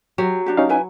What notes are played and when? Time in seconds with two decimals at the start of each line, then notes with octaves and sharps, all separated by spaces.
0.18 F#3 G4
0.46 D4 F#4 G4
0.57 C#4 D#4 F5
0.69 E4 B4 G#5